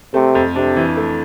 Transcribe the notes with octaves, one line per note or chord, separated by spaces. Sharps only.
C3 A3
F2
C3 D4
E3
A3